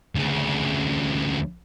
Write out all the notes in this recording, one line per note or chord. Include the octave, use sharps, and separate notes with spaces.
D2 C#3